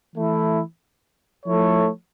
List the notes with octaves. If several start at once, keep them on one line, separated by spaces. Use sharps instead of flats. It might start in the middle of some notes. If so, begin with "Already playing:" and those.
E3 A3 E4
F3 A3 E4 A4 C#5